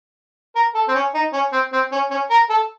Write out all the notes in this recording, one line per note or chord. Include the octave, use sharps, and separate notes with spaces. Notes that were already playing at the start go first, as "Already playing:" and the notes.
A#4
A4
C4
C#4
D#4
C#4
C4
C4
C#4
C#4
A#4
A4